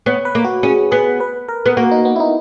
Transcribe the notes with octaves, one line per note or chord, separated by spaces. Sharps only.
B3 C#5
B4
A#3
F#4
C#4 G#4
B3 G#4
B4
A#4
B3
A#3 F#4
D#4
B3
E4
D#4